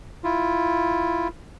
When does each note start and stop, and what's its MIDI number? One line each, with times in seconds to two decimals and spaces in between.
0.24 1.28 64
0.24 1.28 65